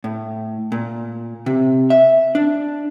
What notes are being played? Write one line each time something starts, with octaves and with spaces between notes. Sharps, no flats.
A2
A#2
C3
E5
D4